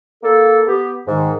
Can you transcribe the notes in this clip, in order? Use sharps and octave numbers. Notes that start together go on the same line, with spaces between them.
A#3 A4
B3 G4
G#2 D#3